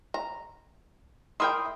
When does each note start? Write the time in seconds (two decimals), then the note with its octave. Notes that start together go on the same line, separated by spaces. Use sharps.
0.14 A#5
1.40 E4 A#4 G5 C6 D#6